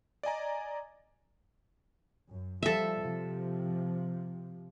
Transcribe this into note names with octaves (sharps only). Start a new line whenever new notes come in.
D5 D#5 G#5 A#5
F#2
F3 G3 A4 E5
C3 F3